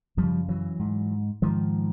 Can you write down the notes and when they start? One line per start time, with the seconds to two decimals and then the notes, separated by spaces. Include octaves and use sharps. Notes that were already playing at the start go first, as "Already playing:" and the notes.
0.17 F#2 C#3 F3 G3
0.48 E3 F#3
0.79 G#2
1.42 G#2 D#3 F3